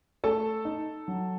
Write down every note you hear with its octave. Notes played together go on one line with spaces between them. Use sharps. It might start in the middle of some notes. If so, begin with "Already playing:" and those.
A3 A4 A5
D#4
F#3